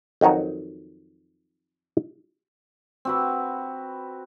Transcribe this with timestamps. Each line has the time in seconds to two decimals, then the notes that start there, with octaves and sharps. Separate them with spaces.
0.21 F2 D#3 F#3 D#4 F#4
3.05 C4 F#4 B4